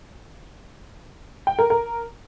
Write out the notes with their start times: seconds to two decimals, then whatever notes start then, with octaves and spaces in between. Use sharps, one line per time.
1.47 G5
1.59 A#4
1.70 A#4